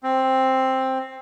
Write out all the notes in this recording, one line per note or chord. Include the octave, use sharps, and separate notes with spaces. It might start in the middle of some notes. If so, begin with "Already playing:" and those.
C4